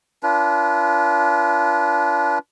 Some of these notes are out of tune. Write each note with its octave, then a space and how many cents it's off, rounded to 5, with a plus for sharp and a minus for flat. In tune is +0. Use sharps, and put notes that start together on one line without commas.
D4 -25 F4 -30 B4 -25